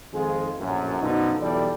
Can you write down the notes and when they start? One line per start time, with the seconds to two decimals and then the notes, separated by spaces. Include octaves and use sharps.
0.13 F2 D#3 G#3 F4 G#4
0.58 A#1 F#2 A2
1.01 F#2 B2 D3 F3 D#4
1.41 B1 E2 G3 A4 D5